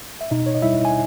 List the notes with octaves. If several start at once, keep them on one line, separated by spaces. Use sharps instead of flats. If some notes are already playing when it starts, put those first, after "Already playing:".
E5
B2 D#4 D#5
C#5
D#5
G3 E4 E5
G#5